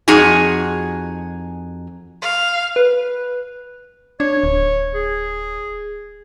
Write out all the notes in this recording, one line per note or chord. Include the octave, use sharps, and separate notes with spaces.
F2 D#4 F#4 G#4 G#5
F5
B4
D4 C#5
D1
G#4